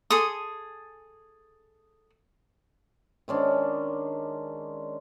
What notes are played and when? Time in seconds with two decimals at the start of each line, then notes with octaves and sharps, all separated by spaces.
0.10 G#4 A4 C6 D#6
3.28 D#3 G#3 C#4 D4